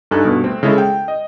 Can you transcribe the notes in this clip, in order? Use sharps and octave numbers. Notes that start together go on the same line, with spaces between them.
G2 D#4 A4 G#5 F#6
G2 B2
A3 C4
C#3 G#3 E4 A4
G5
D#5